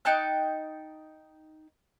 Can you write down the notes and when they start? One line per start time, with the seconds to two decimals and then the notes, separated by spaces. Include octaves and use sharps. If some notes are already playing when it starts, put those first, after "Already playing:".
0.05 D#4 G5 A5 F#6